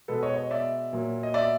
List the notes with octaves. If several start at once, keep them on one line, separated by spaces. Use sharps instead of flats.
B2 G#3 B3 A4 B4
C#5 D#5
C#5 D#5
D5 E5
A#2 F#3 A#3
D#5
D5 E5